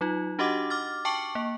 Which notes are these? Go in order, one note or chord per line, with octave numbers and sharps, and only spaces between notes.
F#3 D#4 F4
D4 F#4 G4 D#5 F#5 D6
D6 F6 A6
G5 A5 C#6 D6 C#7 F#7
A#3